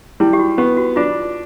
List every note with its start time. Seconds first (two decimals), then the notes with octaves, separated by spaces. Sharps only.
0.20 G3 E4
0.33 G4
0.39 F#4
0.58 B3 G4
0.77 F#4
0.96 D4 F4